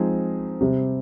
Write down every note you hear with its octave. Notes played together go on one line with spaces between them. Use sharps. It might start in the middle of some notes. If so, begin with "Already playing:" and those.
Already playing: F3 G#3 C4 D#4 G#4
C3 G3 C4 G4